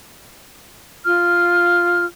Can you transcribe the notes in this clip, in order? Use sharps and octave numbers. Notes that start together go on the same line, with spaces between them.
F4 F6